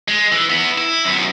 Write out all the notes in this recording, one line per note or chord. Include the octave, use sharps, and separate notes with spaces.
G#3
E3
B3 E4
E4
F#2 B3